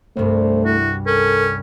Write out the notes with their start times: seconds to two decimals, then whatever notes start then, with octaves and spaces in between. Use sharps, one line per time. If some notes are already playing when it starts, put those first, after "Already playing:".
0.17 C2 G2 A3 C5
0.65 E4 F#4
1.07 C#4 A4 A#4